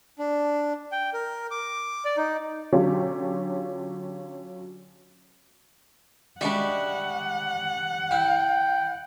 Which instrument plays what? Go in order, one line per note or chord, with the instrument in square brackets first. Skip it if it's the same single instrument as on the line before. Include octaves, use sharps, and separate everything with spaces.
[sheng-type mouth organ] D4
G5
A#4
D6
D5
D#4
[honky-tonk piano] D3 F#3 C#4 F4 G4
[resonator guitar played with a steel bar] G3 D4 [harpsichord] G#3 F#4 E5 [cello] F#5
[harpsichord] E4 [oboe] G5